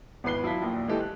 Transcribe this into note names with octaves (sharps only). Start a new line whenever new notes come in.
G#1 E2 B4 C7 G7
F#3 E4 F4 A5 B5 B6
A#1 D#2 A#2
E3 G#3 A3 G4 A4
F#6